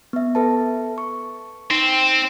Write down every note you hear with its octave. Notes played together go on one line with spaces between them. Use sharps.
B3 E5
A4 B4 A5
C#6
C4 D#4